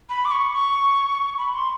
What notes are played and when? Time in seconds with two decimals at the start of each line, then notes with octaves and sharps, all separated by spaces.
0.09 B5
0.25 D6
0.31 C#6
0.53 C#6
1.38 B5
1.54 C6